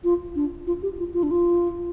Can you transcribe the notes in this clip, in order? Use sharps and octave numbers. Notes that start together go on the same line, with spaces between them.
F4
D4
F4
G4
F4
F4
D4
F4